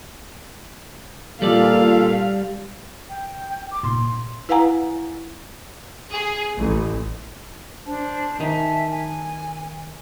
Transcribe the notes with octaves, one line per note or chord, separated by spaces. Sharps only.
A#2 G3 A4 D5 F5
G5
D6
A#2 D#4 C6
E4 B4 F5 F#5 G#5 A#5
G#4
A1
D4 C5 A5
D#3 D#4 E5 G#5 A5
G#5